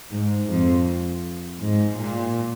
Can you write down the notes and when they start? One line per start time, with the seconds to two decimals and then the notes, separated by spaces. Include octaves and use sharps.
0.11 G#2
0.49 F2
1.60 G#2
1.97 A#2